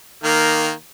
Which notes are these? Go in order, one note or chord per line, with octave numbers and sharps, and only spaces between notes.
D#3 A#3